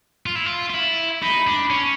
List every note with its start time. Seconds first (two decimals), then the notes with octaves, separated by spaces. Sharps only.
0.26 F4
0.35 E4
0.46 F4
0.70 F4
0.74 E4
1.22 D#4 B5
1.47 D4
1.70 C#4